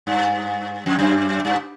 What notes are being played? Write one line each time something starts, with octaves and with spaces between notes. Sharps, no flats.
G2
F2
F#2
G2